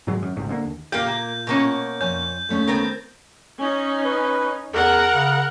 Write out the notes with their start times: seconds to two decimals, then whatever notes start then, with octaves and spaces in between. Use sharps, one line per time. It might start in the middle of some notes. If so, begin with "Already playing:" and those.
0.07 G#2 D#3 F#3 G#3
0.22 F#2
0.36 G#1 C#2 G#2 C3
0.50 D3 A#3
0.65 D#2
0.92 A#2 A#3 G4 F5 G6
1.07 A#3
1.47 B2 A#3 C#4
2.01 F2 C#5 G#5 G6
2.49 D#2 A3 C#4
2.67 B3 C4 A#4
3.59 C#4 D#4
4.05 B4
4.72 E2 A#4 F#5
5.14 C#3